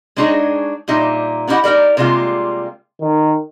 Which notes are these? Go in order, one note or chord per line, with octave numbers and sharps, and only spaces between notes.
G#3 D4 D#4 F#4 G#4 C#5
A#2 G3 D#4 E5
B3 C#4 E4 G4 D#5 F#5
D#4 G4 A#4 D5
C3 G3 G#3 A#3 F4
D#3